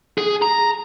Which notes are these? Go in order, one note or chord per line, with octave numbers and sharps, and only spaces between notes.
G#4
A#5